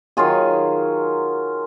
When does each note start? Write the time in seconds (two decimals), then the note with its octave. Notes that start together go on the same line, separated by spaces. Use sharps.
0.17 D#3 F#3 F4 G#4